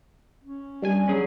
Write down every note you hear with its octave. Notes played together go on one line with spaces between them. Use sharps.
C#4
G3 D4 G#5
F#3 C#4 G#4